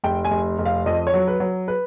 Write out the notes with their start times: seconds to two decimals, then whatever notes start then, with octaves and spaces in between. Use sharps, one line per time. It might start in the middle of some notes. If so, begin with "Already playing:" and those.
0.04 F1 G5
0.25 G#5
0.31 F1
0.58 F1
0.66 F5
0.86 F2 D#5
1.07 C#5
1.14 F#3
1.27 B4
1.40 F#3
1.68 B4